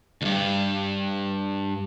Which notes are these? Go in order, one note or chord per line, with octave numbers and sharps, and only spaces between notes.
D2 G2